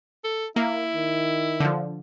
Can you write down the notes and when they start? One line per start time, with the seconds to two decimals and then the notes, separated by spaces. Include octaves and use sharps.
0.24 A4
0.56 A#3 E4
0.94 D#3
1.60 D3 F3